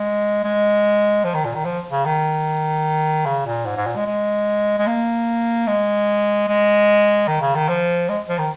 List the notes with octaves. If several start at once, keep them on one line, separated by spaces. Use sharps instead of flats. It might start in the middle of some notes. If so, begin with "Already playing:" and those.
Already playing: G#3
G#3
F3
D#3
A#2
D#3
F3
C#3
D#3
C#3
A#2
G#2
G#2
A#2
G#3
G#3
G#3
A#3
G#3
G#3
D#3
C#3
D#3
F3
G#3
F3
D#3